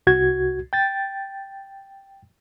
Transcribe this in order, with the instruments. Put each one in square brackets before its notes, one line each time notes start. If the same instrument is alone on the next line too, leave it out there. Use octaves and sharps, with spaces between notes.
[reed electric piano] C2 F#4 G#6
G5 A6